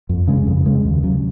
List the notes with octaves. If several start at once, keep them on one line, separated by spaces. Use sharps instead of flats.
F2
C#3 G#3
F2
C#3 G#3
D#2
C#3 F#3